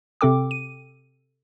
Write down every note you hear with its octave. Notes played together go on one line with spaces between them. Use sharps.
C3 C4 A4 G5 D6
D#7